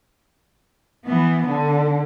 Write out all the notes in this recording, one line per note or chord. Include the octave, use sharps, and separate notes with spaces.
E3 B3
D3